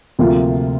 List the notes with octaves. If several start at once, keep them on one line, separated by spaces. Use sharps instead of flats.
D2 C3 F3 A#3 F4